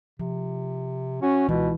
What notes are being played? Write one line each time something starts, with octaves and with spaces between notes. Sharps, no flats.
C3 F3
C#4 F#4
C#2 B2 E3